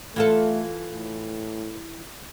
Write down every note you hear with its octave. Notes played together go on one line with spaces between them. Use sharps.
E3 A3 F4 A4
A2